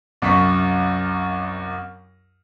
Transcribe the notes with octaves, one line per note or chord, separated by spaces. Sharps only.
C2 F#2 C#6 B6